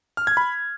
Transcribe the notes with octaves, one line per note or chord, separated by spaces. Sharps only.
F6
G#6
B5